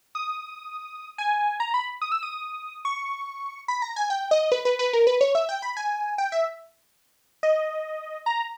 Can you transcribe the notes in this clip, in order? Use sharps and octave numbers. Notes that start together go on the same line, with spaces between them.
D#6
G#5
A#5
B5
D#6
E6
D#6
C#6
B5
A#5
G#5
G5
D#5
B4
B4
B4
A#4
B4
C#5
E5
G5
B5
G#5
G5
E5
D#5
A#5